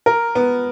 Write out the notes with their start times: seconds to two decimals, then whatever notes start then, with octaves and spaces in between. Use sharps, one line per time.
0.06 A#4
0.35 B3